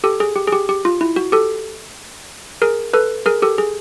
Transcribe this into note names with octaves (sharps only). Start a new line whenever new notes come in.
G4 A4
G#4
G4
G#4
G4
G4
F4
E4
F#4
G4 A4
G#4 A#4
A4 B4
G#4 A#4
G4 A4
G#4